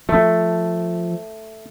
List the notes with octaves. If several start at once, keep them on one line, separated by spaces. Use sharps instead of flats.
F3 A3